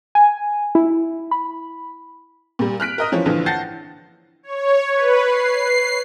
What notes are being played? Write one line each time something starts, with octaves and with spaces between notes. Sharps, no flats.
G#5
E4
B5
A#2 G3
F6 F#6 B6 D7
A#4 D#5 D#6
E3 F3 C#4
A#1 D3 E3 F3
F#5 A5 G6 A6 A#6 C7
C#5
B4
C7